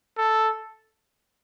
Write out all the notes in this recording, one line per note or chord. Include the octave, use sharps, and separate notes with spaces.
A4